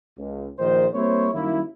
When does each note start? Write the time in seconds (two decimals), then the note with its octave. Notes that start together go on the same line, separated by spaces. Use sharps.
0.18 C#2
0.59 A#1 D#3 C5
0.94 G3 A#3 C4 E4 C5 C#5
1.34 F#2 D#3 G3 A#3 E4